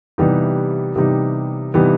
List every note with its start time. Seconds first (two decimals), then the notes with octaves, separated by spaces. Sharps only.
0.18 C3 E3 G3 B3 D#4
0.96 C3 E3 G3 B3 D#4
1.74 C3 E3 G3 B3 D#4